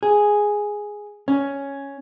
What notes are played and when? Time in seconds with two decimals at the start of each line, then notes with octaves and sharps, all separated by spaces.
0.03 G#4
1.28 C#4